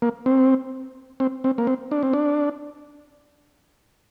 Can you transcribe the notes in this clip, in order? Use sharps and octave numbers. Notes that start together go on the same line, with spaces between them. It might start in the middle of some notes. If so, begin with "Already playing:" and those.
A#3
C4
C4
C4
A#3
C4
D4
C4
D4